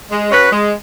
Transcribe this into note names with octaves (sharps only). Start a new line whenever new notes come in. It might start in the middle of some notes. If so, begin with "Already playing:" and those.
G#3
C#4 F#4 B4
G#3